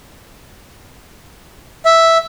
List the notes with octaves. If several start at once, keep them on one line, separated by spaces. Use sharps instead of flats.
E5